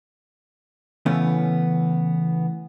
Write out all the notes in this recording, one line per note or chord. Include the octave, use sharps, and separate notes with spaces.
C#3 E3 A3 B3 C#4